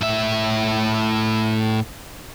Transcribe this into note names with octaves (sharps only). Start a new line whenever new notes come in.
A2 E5